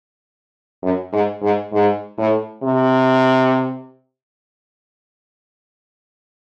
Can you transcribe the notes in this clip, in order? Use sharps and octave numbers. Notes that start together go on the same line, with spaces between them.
F#2
G#2
G#2
G#2
A2
C3